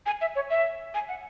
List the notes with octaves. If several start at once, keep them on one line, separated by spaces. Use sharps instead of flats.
G#5
E5
C#5
E5
G#5
F#5